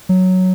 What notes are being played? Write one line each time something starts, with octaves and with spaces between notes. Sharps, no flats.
F#3